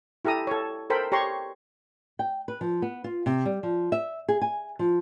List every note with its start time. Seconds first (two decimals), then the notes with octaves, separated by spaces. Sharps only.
0.25 E4 G4 A4 A#5 D#6
0.47 A4 C#5
0.90 A4 A#4 C5 G5 B5
1.12 G4 C#5 A#5 C6 C#6
2.19 G5
2.48 B4
2.61 F3
2.82 B3
3.04 F4
3.26 C3
3.45 G3
3.63 F3
3.92 E5
4.28 G#4
4.42 G#5
4.79 F3